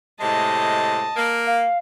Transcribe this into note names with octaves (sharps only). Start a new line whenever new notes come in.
A2 C3 G#3 D#5 A5
A#3
F5